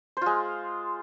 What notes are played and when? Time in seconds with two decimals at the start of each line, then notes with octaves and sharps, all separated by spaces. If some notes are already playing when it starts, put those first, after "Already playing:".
0.17 C5
0.21 F4
0.26 G#3